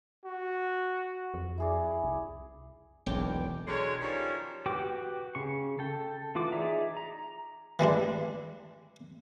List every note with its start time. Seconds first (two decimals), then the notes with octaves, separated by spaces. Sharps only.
0.25 F#4
1.34 F2
1.58 E4 G#4 D5
2.04 C2
3.06 E1 B1 E2 G5 D6
3.67 D3 F#3 G#3 C#4 C#5
4.00 D#3 F3 G3 C#4
4.66 F#4 G4 B4 G5 D6
5.35 C#3 C#6
5.79 A4 G5
6.35 E3 F4 F#4 D6
6.52 D#4 G#4 D5 E5 A#5
6.97 A#5
7.79 E3 G3 G#3 D4